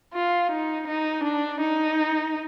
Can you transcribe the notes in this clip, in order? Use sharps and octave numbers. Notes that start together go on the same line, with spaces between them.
F4
D#4
D#4
D4
D#4